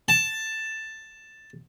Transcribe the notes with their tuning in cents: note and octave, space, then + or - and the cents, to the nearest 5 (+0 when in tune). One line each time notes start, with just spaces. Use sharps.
A5 +5